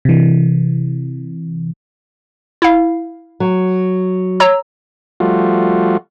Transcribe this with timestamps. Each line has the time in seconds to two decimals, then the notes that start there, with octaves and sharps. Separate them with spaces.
0.05 C3 E3
2.62 E4 F5
3.40 F#3
4.40 C#5 A#5 E6
5.20 F3 G3 A3 F4 F#4